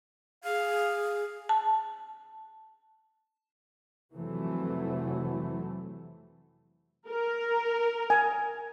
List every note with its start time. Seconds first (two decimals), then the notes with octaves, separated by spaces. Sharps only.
0.44 G#4 F5
1.49 A5
4.15 F2 C3 E3 F#3 A3
7.08 A#4
8.10 G#5